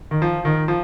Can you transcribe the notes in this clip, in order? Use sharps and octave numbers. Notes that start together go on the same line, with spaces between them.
D#3
F3
D#3
F3